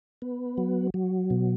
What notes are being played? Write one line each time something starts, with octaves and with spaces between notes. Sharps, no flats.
B3
F#3
F#3
B2